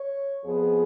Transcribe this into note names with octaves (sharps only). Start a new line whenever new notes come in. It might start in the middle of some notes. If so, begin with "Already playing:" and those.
Already playing: C#5
F2 F3 B3 G#4